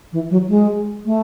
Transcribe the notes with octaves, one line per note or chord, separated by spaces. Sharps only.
E3
F#3
G#3
A3